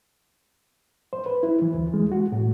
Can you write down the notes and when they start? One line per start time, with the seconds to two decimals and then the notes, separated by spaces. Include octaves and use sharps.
1.13 C5
1.26 B4
1.43 E4
1.62 E3
1.74 D2
1.94 G#3
2.12 F#4
2.32 A2